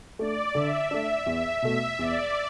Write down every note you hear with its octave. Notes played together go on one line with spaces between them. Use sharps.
A3 D4 D5
D3 E5
A3 D4
E2 E5
B2 A3 E5
E2 D5